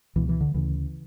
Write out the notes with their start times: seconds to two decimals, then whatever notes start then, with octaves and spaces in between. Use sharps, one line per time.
0.16 C#2 B2 E3
0.29 E3
0.41 D3
0.54 D2 C#3 E3